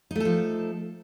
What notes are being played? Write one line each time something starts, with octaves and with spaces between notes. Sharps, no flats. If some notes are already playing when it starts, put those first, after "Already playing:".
F3 A3 D#4 A4